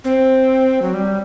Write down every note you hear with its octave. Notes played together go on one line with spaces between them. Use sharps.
C4
F#3
G3